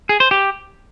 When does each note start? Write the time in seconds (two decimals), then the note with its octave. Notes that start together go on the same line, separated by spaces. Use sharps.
0.09 G#4
0.20 C5
0.31 G4